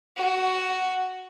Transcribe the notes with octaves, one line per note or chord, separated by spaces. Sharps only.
F#4